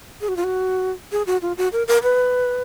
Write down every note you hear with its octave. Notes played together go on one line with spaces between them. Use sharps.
G#4
F#4
F4
F#4
G#4
F#4
F4
F#4
A#4
A#4
B4